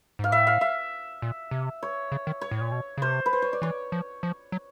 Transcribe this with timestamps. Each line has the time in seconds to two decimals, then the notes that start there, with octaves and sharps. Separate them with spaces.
0.19 G#2 F5
0.31 A2 E5
0.47 F5
0.61 E5
1.22 A#2
1.51 C3
1.83 C#5
2.12 C#3
2.27 D#3
2.41 C#5
2.51 A2
2.61 A#2
2.72 B2
2.98 C#3
3.02 C3 C5
3.26 B4
3.33 C5
3.42 C#5
3.53 D5
3.62 E3 C#5
3.92 F3
4.23 F3
4.52 F#3